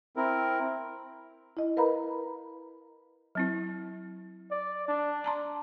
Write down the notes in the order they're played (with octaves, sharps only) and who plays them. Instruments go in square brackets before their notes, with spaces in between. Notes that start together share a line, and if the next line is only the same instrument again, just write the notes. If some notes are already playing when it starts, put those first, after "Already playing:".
[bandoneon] C4 E4 A#4
[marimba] E4 D#5
A#4 B4 F5 A#5 B5
[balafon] F#3 C4 E4
[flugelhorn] D5
D4
[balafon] A5 A#5 C6